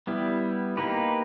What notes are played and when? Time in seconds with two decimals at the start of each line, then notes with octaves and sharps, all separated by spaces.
0.07 G3 B3 E4
0.77 A#3 D#4 G4 B4